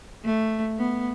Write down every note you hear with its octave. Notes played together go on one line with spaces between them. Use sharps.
A3
B3